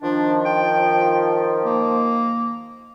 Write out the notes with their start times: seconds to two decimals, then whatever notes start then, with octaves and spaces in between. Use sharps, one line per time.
0.02 D#3 F3 D4
0.46 G5
1.65 A#3